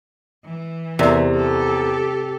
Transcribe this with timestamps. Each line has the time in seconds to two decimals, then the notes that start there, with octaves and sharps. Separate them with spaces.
0.45 E3
0.99 E2 C3 A#4 D5 E5
1.35 G4 A4